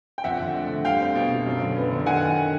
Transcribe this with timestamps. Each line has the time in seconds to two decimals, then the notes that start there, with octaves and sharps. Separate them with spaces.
0.18 G5
0.24 F2 E5 F#5
0.40 D3
0.55 A3
0.70 D3
0.85 G3 F5 G5
1.00 C4
1.15 B2
1.31 B2
1.46 F#2
1.61 D3
1.76 B3
1.91 D3
2.06 D#3 F#5 G#5